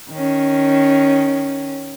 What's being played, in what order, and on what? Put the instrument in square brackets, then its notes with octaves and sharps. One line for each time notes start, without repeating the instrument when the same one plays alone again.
[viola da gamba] D#3 C#4